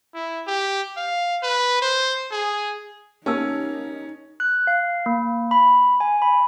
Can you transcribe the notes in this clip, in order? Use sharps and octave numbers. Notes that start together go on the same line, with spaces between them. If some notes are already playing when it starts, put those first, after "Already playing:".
E4
G4
F5
B4
C5
G#4
A#3 C#4 D#4 G4 A5 E6
F#6
F5
A#3
B5
G#5
B5